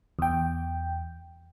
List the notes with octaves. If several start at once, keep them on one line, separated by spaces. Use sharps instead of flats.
E2 G5